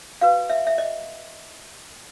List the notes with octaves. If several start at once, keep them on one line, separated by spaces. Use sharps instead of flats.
F#4 B4 F5
E5
E5
D#5